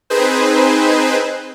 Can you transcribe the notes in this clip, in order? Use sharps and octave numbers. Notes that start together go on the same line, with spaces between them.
C4 D#4 G#4 B4 C5